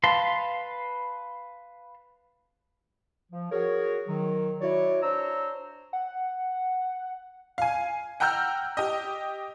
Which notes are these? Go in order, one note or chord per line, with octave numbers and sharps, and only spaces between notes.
B4 F5 A5 C6
F3
F#4 G#4 A#4 C#5
D#3 F#3
E4 F#4 C#5 D5
D4 C5 C#5 A#5 E6
F#5
F5 G#5
F#5 G5 A#5 E6 F6 G6
G4 D#5